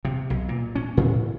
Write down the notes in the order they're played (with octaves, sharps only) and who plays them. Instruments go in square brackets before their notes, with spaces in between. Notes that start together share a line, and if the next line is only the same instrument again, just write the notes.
[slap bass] C3
B1
A#2
C#4
A2